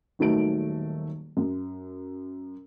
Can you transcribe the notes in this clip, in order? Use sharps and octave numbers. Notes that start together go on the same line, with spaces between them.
D#1 D#3 F#3 A3 D7
F#2